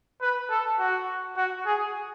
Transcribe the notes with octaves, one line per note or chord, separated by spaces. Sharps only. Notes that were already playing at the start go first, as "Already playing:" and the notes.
B4
A4
F#4
F#4
G#4